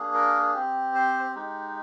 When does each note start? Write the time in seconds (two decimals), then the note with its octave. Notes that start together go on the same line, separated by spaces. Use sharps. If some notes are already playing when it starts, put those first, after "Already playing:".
Already playing: A#3 D4 G#4
0.14 A#4
0.54 C4 G4
0.95 C5
1.36 G#3 D#4 G4